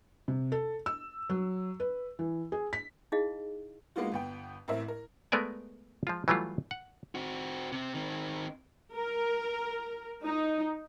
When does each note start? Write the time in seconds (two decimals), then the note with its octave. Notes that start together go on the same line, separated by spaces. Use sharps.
0.28 C3
0.52 A4
0.86 E6
1.30 F#3
1.80 B4
2.19 E3
2.52 G#4
2.73 B6
3.12 D#4 E4 G#4 D#5 F5
3.96 G#3 A#3 B3 D#4 F4 F#4
4.12 G1 B3 G5
4.68 A1 A2 C4 A#4 E5
4.88 A#4
5.32 G#3 A3 B3 A#4 D5 G#5
6.07 F3 G#3 F4
6.28 E3 F#3 G3 A3 F4
6.71 F#5
7.15 C4 F#4
7.72 C3 C4
7.95 D#3 C4
8.94 A#4
10.24 D#4